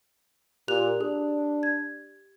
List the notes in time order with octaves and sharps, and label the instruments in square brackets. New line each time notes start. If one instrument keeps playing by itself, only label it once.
[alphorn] A#2 [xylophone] G4 F#6 F7
[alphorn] D4 [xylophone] G#4
[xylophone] G#6